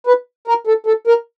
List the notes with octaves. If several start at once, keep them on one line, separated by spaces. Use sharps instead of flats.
B4
A#4
A4
A4
A#4